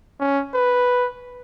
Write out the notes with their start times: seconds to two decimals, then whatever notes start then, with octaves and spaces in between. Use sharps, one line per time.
0.20 C#4
0.54 B4